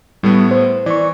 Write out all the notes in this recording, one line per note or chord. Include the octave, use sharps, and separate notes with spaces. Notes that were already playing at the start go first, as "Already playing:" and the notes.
A2 G3 A3 B3
C5
E3 D5 C#6